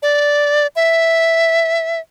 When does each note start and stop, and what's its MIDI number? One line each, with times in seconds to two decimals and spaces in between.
0.02 0.67 74
0.76 2.00 76